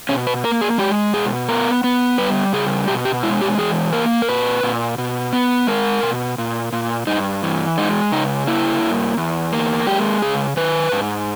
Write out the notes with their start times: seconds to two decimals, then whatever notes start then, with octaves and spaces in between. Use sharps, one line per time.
0.09 B2 C#4
0.27 B4
0.44 A#3 A#4
0.61 G#4
0.78 G#3 G4
1.13 B2 G#4
1.48 B3 A#4
1.84 B3
2.18 G3 B4
2.53 C#3 G#4
2.88 B2 G4
3.05 G4
3.23 G#3 E4
3.41 G4
3.58 E3 G#4
3.93 A#3 A#4
4.22 A#4
4.29 A#2 B4
4.63 A#2
4.98 B2
5.33 B3
5.67 G#3 A#4
6.03 B2
6.38 A#2
6.72 A#2
7.07 G2 D#4
7.43 E3
7.78 G#3 D#4
8.12 C#3 D#4
8.47 A#3 E4
8.82 G2
9.17 E2
9.53 A#3
9.86 G#3 G4
10.22 C#3 G#4
10.57 D#3 B4
10.92 G#2